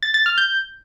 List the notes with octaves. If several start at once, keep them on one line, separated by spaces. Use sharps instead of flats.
A6
A6
F6
G6